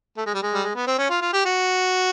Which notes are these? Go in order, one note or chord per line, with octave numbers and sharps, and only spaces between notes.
A3
G#3
G3
G#3
G3
G#3
B3
C4
C#4
F4
F4
G4
F#4